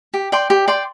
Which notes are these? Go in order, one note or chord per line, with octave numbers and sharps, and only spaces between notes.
G4
D5 G5 C6
G4
D5 G5 C6